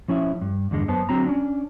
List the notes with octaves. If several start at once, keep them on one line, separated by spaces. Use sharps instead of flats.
F3 C#4 E4 E5
G2
E2 G2 D3 G#3
F#2 B3 C5 A5
D3 F#3 C4 A#5
C#4 D4